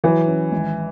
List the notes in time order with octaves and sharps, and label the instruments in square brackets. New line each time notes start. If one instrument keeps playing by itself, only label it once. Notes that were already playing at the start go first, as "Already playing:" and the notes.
[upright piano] E3 [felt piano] F#3
[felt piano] C#4
G#1